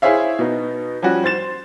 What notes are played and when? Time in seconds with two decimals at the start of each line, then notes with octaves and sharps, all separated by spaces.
0.02 E4 G#4 C5 C#5 E5 F5
0.39 B2 B3 D#4
1.02 F3 G3 C#4 F#4
1.24 C5 C6 A6 E7